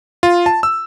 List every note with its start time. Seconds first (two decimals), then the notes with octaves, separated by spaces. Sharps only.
0.23 F4
0.46 A5
0.63 E6